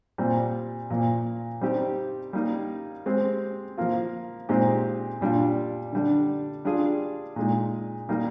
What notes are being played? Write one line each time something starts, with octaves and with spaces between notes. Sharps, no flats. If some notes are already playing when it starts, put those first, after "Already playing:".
A#2 G3 C4
A#2 F3 A#3
G3 C4 D#4 G4
G3 A#3 D#4
G#3 C4 G4
F3 A#3 F4
A#2 G#3 C4 D#4 G4
A#2 G3 D4 F4
D3 G3 D4
G3 D4 F4 G#4
A#2 G#3 D#4
D#3 G3 A#3 D#4